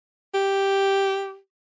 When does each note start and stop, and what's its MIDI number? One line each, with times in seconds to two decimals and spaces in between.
0.34 1.37 67